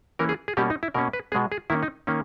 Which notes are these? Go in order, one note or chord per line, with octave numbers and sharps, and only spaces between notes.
E3 A#3 C#4 A#4
G#4
G#4
B2 G3 A#3 C#4 G4
D#4
E4
B2 A#3 C#4 A#4
B4
B2 G#3 B3 G#4
G#4
D#3 A#3 C#4 E4
D#4
D#3 A#3 C#4